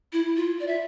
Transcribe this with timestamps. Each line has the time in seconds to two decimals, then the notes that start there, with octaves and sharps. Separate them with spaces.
0.13 E4
0.37 F4
0.60 D5
0.67 E5